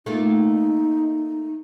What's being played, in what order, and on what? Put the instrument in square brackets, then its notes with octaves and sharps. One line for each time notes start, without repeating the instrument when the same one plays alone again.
[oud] A3 A#3 F4 [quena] D#4